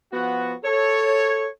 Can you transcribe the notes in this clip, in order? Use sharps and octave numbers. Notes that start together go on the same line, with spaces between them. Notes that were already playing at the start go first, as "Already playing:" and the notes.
F3 B3 F#4
A4 C#5